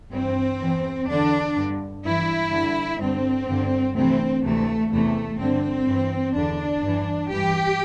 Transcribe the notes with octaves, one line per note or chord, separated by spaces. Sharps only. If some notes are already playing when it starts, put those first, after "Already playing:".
G2 E3 C4
E2 E3
E2 D3 D4
G2 D3
G2 E3 E4
G2 D3
G2 D3 C4
G2 D3
D2 C3 E3 C4
D2 C3 E3 A3
E2 C3 E3 A3
G2 D3 C4
G2 E3
E2 D3 D4
G2 E3
G2 E3 G4